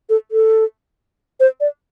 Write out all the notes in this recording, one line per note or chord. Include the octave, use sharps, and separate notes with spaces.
A4
A4
C5
D5